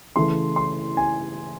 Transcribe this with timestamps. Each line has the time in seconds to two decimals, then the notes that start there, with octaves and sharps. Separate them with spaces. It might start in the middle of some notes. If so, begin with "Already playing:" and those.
0.16 C#3 E3 A3 C6
0.56 C6
0.97 G#5